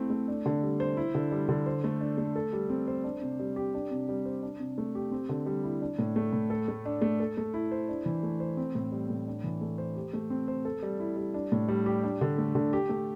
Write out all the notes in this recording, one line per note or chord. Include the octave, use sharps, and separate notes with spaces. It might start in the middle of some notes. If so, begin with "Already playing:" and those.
Already playing: A3 C4 E4
A3
D4
D3
G3
C5
E4
D3
G3
D3
C5
A3
D4
A3
A4
G3
C4
C5
D4
C3
G3
G4
D4
C3
G3
C5
D4
C3
A3
G4
C4
D3
G3
E4
D4
A2
A3
A2
A4
A3
D4
A3
A4
A3
E4
C5
D4
E3
A3
C5
C4
A2
G3
A2
D4
E3
A3
C5
G4
A3
C4
C5
A4
G3
E4
G3
D4
A2
G3
G4
D4
D3
A3
D3
G4
A3